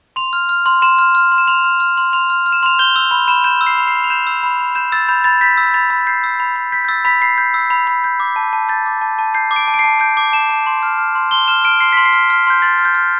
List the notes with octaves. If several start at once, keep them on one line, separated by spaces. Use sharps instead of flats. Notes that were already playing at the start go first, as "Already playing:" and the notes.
C6 F7
F6
F6
C6
C6 E7
F6
F6
C6
E7
C6 F7
F6
F6
C6
C6 F7
F6
F6
E7
C6 F7
G6 G7
E6 F7
B5
B5 E7
G6 E7
E6
C7
B5
C7
B5
F7
G6 E7
E6
B5
B5
G6 E7
E6 A6
B5 G6
B5 A6
G6 B6
E6
B5 A6
B5
G6 C7
E6
B5
B5
G6 B6
G6
E6 A6
B5 B6
B5 C7
G6
E6
B5
B5
G6
D6
A5
A5
G6 A6
D6
A5
A5
G6 C7
D6
D7
A5
D7
C7
A5
G6 D7
D6
A5 E7
A5
C6
F6
F6
C6
C6 G7
F6 E7
F6 D7
C6 C7
C6 B6
C7
F6
F6
C6 G6
C6 A6
F6
G6
F6